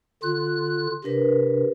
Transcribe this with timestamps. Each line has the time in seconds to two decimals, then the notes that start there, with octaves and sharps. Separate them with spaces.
0.23 D3 F4 F#6
1.04 C3 D4 A#4 B4